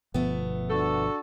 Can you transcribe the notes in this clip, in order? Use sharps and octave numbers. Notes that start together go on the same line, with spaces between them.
G1 B2 F3 A3 B3
D4 F#4 A4